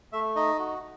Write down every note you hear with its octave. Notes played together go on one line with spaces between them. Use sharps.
A3 E5
D#4 D#5
F#4